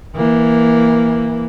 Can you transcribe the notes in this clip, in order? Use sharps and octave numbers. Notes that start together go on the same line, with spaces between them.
E3 A#3